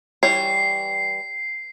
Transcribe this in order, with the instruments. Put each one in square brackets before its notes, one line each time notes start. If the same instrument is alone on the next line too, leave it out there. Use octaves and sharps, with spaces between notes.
[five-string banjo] E3 G3 C#5 [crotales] C7